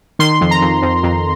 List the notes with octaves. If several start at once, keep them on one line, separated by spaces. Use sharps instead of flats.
D#3 C6
F2
A#5
F2
F2
F2